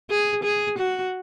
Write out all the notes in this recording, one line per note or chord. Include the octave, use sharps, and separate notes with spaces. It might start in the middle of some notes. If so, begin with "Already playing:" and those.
G#4
G#4
F#4